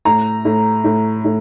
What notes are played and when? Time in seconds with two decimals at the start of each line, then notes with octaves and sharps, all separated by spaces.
0.05 A2 A#5
0.45 A2
0.84 A2
1.25 A2